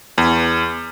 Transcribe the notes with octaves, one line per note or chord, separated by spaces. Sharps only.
E2